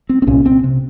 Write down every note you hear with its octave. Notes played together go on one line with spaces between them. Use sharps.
C4
C4
C2 A#2 C#4
C4
C3